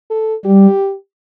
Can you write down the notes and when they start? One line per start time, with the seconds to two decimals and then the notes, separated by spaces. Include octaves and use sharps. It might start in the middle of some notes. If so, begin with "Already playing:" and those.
0.10 A4
0.45 G3 G4